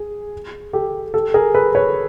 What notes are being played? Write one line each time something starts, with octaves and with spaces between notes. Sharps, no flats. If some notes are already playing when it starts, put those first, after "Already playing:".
Already playing: G#4
G4 A4
G4 A4
G#4 A#4
A4 B4
B4 C#5